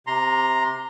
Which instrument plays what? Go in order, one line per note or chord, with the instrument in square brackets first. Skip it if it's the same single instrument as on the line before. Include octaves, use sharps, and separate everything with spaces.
[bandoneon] C3 A#5 C6